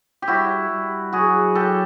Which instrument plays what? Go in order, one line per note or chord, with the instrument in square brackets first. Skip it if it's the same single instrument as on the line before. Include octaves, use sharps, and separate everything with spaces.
[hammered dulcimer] G4
[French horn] G3 [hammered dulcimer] E4 F#4
[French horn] G3
[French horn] F#3 [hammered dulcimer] F#4 G#4
[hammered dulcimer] G4 A4